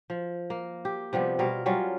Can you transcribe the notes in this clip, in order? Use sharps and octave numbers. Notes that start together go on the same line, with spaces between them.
F3
A#3
G4
C3 F3 G3 B3
B2 G3 F4 A#4
F#3 G3 C#4 F4